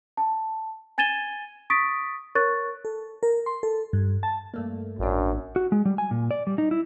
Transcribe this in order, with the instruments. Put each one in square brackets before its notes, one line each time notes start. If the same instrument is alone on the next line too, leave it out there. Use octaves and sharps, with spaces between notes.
[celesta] A5
G#5 G#6 A6 D#7 E7 G7
C#6 D#6 A6 B6 D7
A#4 C#5 C#6 F#6 A6
[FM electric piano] A4
A#4
C6
A4
G2
A5
[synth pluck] G2 A3 A#3
[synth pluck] A1 D4 [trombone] F#2
[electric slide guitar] F#4
G#3
G3
G#5
A#2
D5
G3
D#4
E4